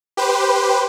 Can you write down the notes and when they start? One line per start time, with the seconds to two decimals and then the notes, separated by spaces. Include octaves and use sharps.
0.17 G4 B4 C5